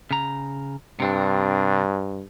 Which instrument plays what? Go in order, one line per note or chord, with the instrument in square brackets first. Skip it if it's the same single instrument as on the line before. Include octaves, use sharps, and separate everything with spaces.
[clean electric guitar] C#3 A#5
[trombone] G2 [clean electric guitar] C3 C4 D4